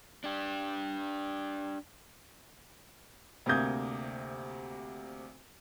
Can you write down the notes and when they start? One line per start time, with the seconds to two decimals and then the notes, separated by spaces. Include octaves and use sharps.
0.24 D4 G4
3.46 D2 C3 A#3 D#6 G6 G#6